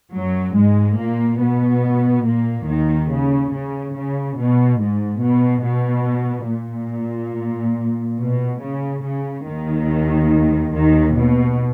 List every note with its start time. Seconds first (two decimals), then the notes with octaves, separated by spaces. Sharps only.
0.15 F#2 F#3
0.57 G#2 G#3
0.99 A#2 A#3
1.41 B2 B3
2.26 A#2 A#3
2.69 D#2 D#3
3.12 C#3
3.54 C#3
3.96 C#3
4.39 B2
4.81 G#2
5.24 B2
5.65 B2
6.50 A#2
8.20 B2
8.62 C#3
9.04 C#3
9.46 D#2 D#3
10.74 D#2 D#3
11.16 B2